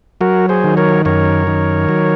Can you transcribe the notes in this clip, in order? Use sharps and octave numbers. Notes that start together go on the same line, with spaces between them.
F#3 F#4 A#4
G#4 C5
D#3
A#4 C#5
F#2 A#4 C#5
D#3
F#3